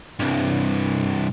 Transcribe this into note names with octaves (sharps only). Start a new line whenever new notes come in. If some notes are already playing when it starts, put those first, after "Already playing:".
C2 G2